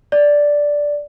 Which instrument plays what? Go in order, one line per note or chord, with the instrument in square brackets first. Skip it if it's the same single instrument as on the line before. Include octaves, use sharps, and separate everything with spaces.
[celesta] D5